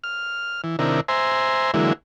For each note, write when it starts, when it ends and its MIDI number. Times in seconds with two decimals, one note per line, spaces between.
0.04 0.61 89
0.64 0.76 52
0.79 1.01 48
0.79 1.01 51
0.79 1.01 62
0.79 1.01 64
0.79 1.01 70
1.08 1.71 72
1.08 1.71 76
1.08 1.71 80
1.08 1.71 82
1.08 1.71 84
1.74 1.93 50
1.74 1.93 52
1.74 1.93 54
1.74 1.93 56
1.74 1.93 58
1.74 1.93 64